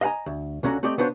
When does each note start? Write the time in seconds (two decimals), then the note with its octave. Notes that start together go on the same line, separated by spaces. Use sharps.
0.01 D#5 F5 F#5 G#5 A#5
0.26 D2
0.63 C#2 D3 C#4 F#4 A#5
0.83 A3 C4 G4 D5 D#5
0.98 C#3 B3 D4 F#4 G4 C5